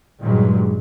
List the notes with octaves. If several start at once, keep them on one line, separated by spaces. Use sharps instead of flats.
G2 A#2 D#3 F#3 G#3